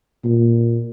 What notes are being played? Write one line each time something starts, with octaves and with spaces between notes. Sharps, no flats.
A#2